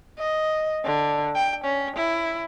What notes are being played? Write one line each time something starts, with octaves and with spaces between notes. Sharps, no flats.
D#5
D3
G5
C#4
E4